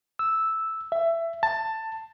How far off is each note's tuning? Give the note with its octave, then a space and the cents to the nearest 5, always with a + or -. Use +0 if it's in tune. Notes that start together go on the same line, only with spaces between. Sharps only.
E6 -5
E5 +15
A5 +15